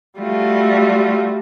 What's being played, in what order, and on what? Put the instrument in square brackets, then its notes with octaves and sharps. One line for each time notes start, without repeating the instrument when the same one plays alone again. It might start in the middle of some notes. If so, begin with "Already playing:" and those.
[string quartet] G3 A3 F4 F#4